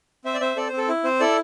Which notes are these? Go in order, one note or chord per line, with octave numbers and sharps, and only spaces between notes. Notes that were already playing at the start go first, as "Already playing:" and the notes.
C4 C5 E5
D5
C4 C5 E5
C4 A4 D5
C4 C5
A4
E4
C4 C5
E4 A4 D5